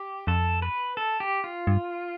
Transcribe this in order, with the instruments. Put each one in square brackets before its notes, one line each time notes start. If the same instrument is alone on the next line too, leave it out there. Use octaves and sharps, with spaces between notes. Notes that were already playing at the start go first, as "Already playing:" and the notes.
Already playing: [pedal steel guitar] G4
[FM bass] F2 [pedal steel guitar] A4
[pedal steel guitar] B4
A4
G4
F4
[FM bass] G2